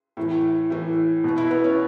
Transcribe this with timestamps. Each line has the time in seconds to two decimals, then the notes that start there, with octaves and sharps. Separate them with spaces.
0.17 A2 E3
0.70 A2 E3
1.24 B2
1.38 E4
1.51 B3
1.64 C#4